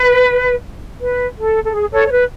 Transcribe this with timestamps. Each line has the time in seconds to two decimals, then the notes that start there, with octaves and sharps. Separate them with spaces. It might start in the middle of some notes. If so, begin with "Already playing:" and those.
Already playing: B4
1.01 B4
1.37 A4
1.64 A4
1.73 G#4
1.92 A4 C#5
2.07 C#5
2.12 B4